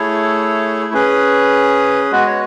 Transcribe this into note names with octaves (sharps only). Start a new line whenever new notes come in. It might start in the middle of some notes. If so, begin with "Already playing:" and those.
Already playing: A3 E4 G#4 A4 C#5
C#4 G#4 B4
G#3 B3 F#4 B4
C#5